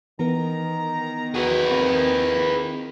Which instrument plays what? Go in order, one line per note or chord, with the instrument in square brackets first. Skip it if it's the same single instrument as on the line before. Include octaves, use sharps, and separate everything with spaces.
[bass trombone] D#3 [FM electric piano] E3 B3 A#4 [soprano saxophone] A#5
[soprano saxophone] F#4 [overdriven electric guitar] G#4 B4
[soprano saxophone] A#3 [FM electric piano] C4